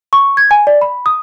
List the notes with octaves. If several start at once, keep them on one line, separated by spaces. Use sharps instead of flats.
C#6
G#6
G#5
D5
B5
D#6